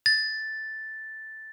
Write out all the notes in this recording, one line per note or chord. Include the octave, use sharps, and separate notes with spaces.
A6